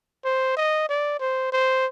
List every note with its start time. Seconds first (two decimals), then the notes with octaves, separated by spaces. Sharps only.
0.24 C5
0.57 D#5
0.89 D5
1.20 C5
1.53 C5